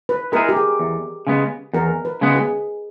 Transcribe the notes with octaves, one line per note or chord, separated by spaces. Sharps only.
B4
G#3 B3 E4 G#4 A#4
G4
G#4
E2
C#3 G#3 B3
E2 A#4
B4
C#3 G#3 B3
G#4